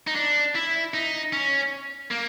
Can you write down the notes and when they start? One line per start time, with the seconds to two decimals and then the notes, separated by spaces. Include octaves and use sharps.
0.07 D#4
0.16 D4
0.55 E4
0.94 D#4
1.33 C#4
2.11 A#3